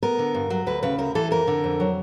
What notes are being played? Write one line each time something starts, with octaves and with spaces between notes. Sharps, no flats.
B3 A#4
D3
G2
F#3
D2 B4
C#3 B4
D2 A#4
E3 A4
F2 A#4
D3
F2
F#3